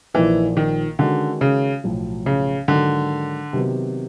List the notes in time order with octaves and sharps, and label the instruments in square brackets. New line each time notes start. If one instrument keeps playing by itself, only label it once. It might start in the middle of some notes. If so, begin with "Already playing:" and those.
[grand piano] A#1 A#2 F3 A#3 D#4 [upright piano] E3
[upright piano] D#3
[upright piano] D3 [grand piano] D#3 G#3 C#4 F#4
[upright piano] C#3
[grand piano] B1 A2 F3
[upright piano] C#3
[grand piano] G#2 D#3 F#3 [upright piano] D3
[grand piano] C3 D#3 F#3 B3